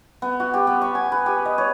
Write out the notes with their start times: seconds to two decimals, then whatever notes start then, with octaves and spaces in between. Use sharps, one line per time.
0.22 B3
0.40 F#4
0.54 G4
0.67 B3
0.82 C#6
0.95 G#5
1.12 B4
1.26 G4
1.45 D#5
1.58 C#5